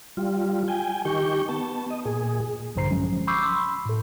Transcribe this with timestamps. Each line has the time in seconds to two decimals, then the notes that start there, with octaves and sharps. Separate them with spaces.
0.17 G3 F4
0.68 G5 G#5
1.05 D#3 G4 C#6 G6
1.49 B3 A5
1.90 D#5
2.05 A#2 G#4
2.76 A#1 G2 D3 C5 A#5 C7
2.91 F3 F#3 G#3 C#4
3.27 B5 C#6 D6 E6 G6 C7
3.43 B5 C6 E6
3.85 A2 A4